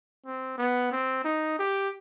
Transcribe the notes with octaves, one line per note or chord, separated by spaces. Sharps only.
C4
B3
C4
D#4
G4